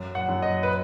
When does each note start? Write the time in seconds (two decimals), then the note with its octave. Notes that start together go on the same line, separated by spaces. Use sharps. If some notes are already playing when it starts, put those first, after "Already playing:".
Already playing: F#2
0.15 F#5
0.29 F#2
0.42 D#5
0.63 B4